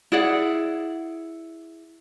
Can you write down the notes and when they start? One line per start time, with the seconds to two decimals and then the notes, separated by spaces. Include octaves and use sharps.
0.12 E4 G#4 D5 F#5